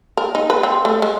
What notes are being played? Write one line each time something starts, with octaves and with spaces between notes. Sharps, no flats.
A#4
D#4
B4
C4
A3
G#3